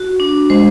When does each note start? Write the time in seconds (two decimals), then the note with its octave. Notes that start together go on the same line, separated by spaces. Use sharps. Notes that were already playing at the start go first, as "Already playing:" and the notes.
Already playing: F#4
0.20 D4
0.50 G#3 C5